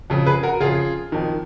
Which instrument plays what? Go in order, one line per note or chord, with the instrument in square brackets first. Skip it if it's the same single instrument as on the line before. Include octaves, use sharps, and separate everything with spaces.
[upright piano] F2 C#3
G#4 B4
F#4 A#4
F2 C#3 F4 G#4
F2 D#3